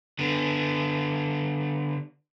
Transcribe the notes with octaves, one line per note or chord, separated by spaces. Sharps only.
D3 B3